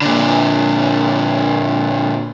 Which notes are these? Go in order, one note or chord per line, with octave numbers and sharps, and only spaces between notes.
A#2 D3